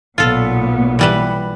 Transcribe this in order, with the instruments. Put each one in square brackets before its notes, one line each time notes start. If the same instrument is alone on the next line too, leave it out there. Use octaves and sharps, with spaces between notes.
[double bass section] B1 [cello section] A#2 B3 [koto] F4 A4
[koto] E3 G3 B4